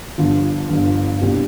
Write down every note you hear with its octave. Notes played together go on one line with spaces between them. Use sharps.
G1 G2 D3 F3 F4
G1 G2 D3 F3
C2 B2 G3 D4 G4